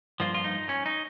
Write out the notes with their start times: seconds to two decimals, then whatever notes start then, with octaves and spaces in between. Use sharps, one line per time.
0.20 G2 F3 A#3 F4
0.34 F4
0.44 D#4
0.69 C#4
0.86 D#4